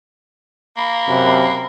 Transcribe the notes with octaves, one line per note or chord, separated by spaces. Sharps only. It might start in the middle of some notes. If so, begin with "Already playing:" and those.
A#3 B5
F#2 C3